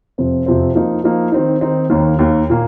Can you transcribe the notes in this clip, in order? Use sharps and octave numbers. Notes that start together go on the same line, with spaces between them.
F2 C3 F3 C4
F2 C3 F3 C4
F3 A#3 D#4
F3 A#3 D#4
D#3 C4 D#4
D#3 C4 D#4
D#2 D#3 A#3
D#2 D#3 A#3
A#2 A#3